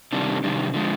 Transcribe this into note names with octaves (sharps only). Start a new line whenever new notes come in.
C3 D#3 G3 D4
C3 D#3 G3 D4
D3 F3 G#3